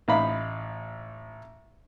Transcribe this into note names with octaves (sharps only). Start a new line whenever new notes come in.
A1 D#4 F5 A#5 B5